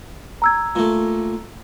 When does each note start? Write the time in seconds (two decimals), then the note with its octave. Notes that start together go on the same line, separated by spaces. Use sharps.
0.42 A#5 E6 G#6
0.75 A#2 A3